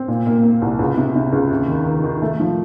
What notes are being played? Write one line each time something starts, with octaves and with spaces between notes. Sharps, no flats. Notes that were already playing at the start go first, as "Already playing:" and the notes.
Already playing: C4
A#2
A#3
A#3
C2
C#2
C3
C3
C#2
D#2
D#3
D#3
D#3
A3
F3